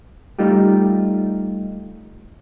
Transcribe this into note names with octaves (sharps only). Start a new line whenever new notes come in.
G3 A3 D#4 F4 G4